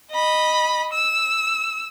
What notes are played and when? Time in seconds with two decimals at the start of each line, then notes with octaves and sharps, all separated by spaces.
0.12 D#5 B5
0.92 E6